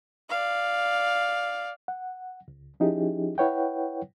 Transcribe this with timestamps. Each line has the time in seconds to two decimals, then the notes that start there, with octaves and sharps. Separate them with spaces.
0.29 D5 F5
1.88 F#5
2.48 C#2
2.80 F3 C#4 D#4 E4 G4 G#4
3.38 E4 B4 C#5 F#5 G5